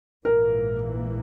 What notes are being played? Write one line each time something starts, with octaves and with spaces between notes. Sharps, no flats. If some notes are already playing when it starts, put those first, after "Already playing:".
A#1 G#2 E3 A#3 A#4